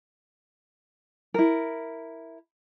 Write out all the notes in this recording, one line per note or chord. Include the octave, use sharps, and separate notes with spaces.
E4 A#4